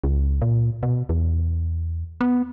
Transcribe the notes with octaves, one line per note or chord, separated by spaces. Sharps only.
C#2
A#2
B2
E2
B3